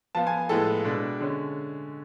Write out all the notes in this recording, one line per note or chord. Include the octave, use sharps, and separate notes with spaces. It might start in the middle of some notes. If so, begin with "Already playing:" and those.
F3 B3 F4 A5
G#5
A2 F3 G#3 B3 A4
B2 G#3 D4
D3 G#3 C#4